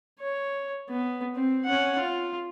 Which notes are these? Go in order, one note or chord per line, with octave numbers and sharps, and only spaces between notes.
C#5
B3
C4
C#4 F#5
F4